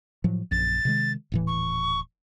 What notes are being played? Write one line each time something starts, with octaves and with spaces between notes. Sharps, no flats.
A2 F3 F#3
A#1 F#2 A6
C3 D#3 G#3
D#1 A2 E3
C#6